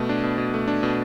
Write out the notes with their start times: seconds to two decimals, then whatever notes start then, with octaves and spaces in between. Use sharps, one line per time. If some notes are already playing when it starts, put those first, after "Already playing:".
Already playing: B2 A3
0.09 D4
0.23 B2
0.38 B2
0.54 A3
0.68 D4
0.83 B2